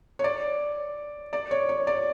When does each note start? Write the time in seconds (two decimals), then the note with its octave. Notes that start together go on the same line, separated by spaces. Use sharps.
0.19 C#5
0.24 D5
1.33 D5
1.51 C#5
1.69 C#5
1.87 D5